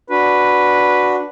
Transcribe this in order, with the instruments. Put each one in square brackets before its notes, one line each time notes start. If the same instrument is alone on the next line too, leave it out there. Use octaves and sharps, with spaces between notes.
[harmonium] D4 F#4 [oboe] B4